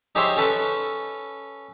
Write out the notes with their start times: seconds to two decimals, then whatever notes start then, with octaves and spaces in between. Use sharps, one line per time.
0.15 D#4 G4 G#4 C5 C#5 E5
0.37 C#4 A4 B4